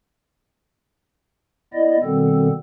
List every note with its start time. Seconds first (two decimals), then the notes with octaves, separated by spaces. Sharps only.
1.73 B3 E4 D5 D#5
2.03 B2 D#3 G3 B3 C4 A4